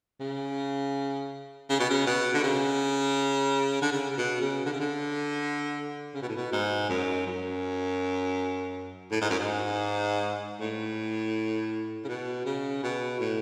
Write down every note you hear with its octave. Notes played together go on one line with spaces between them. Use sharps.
C#3
C#3
B2
C#3
B2
D3
C#3
D3
C#3
C#3
B2
C#3
D3
C#3
D3
C#3
B2
A2
B2
G#2
F#2
F#2
A2
G#2
F#2
G#2
A2
C#3
B2
C#3
B2
A2